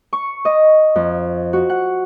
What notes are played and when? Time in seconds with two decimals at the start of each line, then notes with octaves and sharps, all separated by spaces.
0.13 C#6
0.45 D#5
0.96 F2
1.53 F#4
1.70 F#5